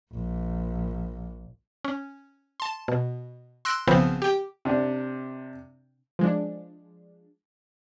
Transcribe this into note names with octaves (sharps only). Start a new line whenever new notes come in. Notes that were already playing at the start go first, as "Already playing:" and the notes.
A#1
C#4
A5 C6
B2
C6 E6 F#6 A#6 D7
B1 C#3 F3 B3 C4 C5
G4 G5
C3 D4
F3 G#3 D4